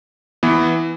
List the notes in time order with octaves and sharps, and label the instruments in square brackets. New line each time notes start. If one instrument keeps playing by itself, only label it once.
[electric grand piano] E3 B3